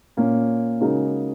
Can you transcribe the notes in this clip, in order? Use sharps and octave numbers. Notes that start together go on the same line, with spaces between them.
A#2 A#3 C#4
C#3 G#3 D#4 F#4 A#4